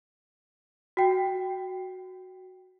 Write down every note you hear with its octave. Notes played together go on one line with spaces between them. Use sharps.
F#4 G5